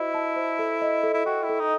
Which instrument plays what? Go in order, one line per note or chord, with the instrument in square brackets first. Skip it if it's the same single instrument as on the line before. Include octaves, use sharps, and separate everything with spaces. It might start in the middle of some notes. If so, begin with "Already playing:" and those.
Already playing: [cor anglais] E4 [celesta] F#4 C5 D#5
[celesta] A5
C5
A4
D#5
A4
[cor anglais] E4
[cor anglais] F#4 [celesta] G5
[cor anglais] E4
[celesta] A4
[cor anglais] D#4